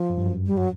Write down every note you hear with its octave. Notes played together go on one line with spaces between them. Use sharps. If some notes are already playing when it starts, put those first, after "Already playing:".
Already playing: F3
F#2
G2
F#2
G3
F#3